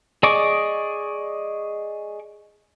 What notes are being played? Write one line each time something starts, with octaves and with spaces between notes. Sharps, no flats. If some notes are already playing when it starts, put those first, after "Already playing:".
G#4 D5 D#5 C#6 D6